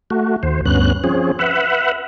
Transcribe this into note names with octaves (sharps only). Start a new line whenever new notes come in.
A3 F#4
D#2 C5
D2 G2 B3 C#4 F#6
F3 C4 C#4 G#4
B4 E5 F#5